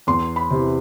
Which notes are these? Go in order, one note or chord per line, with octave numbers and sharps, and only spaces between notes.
E2 C6
B5
C3 E3